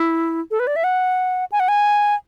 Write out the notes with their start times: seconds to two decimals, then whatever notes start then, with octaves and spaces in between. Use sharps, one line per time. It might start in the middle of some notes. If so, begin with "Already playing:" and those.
Already playing: E4
0.51 A4
0.60 B4
0.67 D5
0.76 E5
0.84 F#5
1.52 G#5
1.60 F#5
1.68 G#5